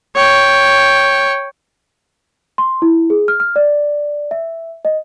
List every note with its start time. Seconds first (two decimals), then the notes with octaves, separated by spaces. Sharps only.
0.16 C#5 G5
2.58 C6
2.82 E4
3.10 G#4
3.28 F6
3.40 F6
3.56 D5
4.31 E5
4.85 D#5